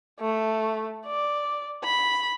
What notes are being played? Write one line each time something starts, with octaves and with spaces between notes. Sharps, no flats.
A3
D5
B5